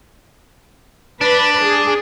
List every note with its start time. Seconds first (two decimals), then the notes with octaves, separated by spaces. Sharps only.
1.21 D4 B4
1.64 G#4